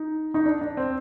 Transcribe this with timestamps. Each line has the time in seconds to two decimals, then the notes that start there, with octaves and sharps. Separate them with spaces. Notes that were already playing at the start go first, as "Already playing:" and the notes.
Already playing: D#4
0.34 D#4
0.46 D4
0.61 D4
0.77 C4